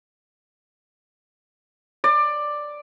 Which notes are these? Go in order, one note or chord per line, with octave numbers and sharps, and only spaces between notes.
D5